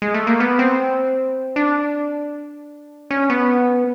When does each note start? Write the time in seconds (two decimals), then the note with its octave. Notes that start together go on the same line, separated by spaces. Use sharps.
0.02 G#3
0.14 A3
0.27 A#3
0.40 B3
0.59 C4
1.56 D4
3.11 C#4
3.30 B3